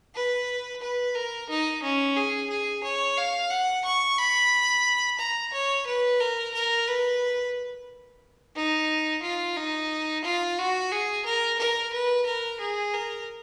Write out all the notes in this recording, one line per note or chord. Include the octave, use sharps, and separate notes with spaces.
B4
B4
A#4
D#4
C#4
G#4
G#4
C#5
F5
F#5
C#6
B5
A#5
C#5
B4
A#4
A#4
B4
D#4
F4
D#4
F4
F#4
G#4
A#4
A#4
B4
A#4
G#4
A#4